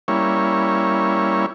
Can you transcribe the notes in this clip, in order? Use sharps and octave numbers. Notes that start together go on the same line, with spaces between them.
G3 A#3 C#4 E4 C#5